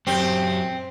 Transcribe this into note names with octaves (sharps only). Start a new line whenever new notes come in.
F#2 C4 G4